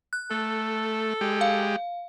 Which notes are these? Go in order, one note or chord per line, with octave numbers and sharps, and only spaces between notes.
F#6
A3 A4
G#3 G4
F5